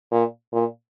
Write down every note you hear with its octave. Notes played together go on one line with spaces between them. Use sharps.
A#2
A#2